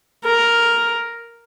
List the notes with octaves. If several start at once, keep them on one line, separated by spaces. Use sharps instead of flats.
A#4